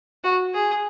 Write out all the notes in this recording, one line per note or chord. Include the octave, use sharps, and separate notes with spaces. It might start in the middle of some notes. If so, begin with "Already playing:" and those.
F#4
G#4